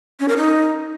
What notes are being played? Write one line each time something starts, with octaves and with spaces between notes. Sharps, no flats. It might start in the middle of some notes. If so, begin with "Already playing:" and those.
C#4
A#4
D#4